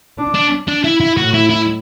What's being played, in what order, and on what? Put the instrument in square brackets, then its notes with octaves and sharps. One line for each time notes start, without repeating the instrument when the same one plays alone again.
[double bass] D4
[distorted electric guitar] D4
D4
E4
E4
[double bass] A2 [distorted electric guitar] F#4
[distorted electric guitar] E4
E4